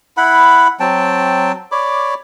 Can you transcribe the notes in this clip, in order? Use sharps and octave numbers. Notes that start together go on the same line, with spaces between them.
E4 F#5 B5
F#3 C4 G5 A5
C#5 D5 B5 D6